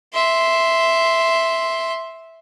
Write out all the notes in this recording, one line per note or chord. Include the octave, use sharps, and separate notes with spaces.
E5 C6